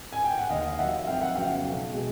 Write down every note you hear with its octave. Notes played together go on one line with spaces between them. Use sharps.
G#5
G5
F#5
D#2 D#5 F5
D#3 F#3 E5 F#5
F2 F5 G5
E5 F#5
C#3 F#3 B3 F5 G5
B1
B2 G#3